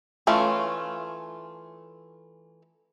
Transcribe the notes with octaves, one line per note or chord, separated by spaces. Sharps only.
E3 A3 C#4 F4